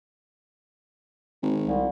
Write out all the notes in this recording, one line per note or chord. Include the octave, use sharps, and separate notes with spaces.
G#1
C2